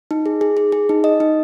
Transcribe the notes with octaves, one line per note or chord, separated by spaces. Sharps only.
D#4
G#4
G#4
G#4
G#4
D#4
D#5
D#4